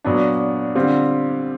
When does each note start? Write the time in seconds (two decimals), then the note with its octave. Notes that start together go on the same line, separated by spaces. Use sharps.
0.04 A#2 F#3 B3 D4
0.75 D3 G3 C4 F4